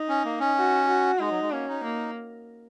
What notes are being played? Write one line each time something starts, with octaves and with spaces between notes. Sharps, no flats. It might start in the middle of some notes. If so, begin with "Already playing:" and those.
Already playing: D#4
C#4
A#3
C#4
F#4
F#4
G#3 D#4
F#3
G#3
A#3 C#4
D#4
A#3